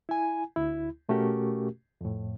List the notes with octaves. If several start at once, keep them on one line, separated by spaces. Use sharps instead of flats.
E4 G#5
D2 E4
B2 A3 C#4 F#4 G4 A#4
F2 A2